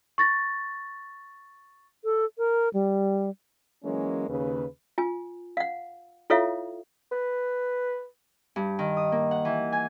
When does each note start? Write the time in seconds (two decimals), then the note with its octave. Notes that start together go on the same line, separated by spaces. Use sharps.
0.18 C#6 A6 A#6
2.04 A4
2.38 A#4
2.74 G3
3.84 E3 F#3 G#3 A#3 C#4
4.28 D#2 C#3 B4
4.98 F4 G#5
5.57 F5 F#5
6.30 E4 F4 A4 C#5 E5 F5
7.12 B4
8.56 G2
8.79 D#3
8.97 D#6
9.12 A#3
9.31 F#5
9.45 E3
9.72 G#5